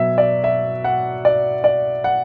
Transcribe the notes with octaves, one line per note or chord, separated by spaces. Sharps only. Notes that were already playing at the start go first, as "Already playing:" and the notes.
Already playing: B2 F#3 E5
D5
E5
F#5
D5
D5
F#5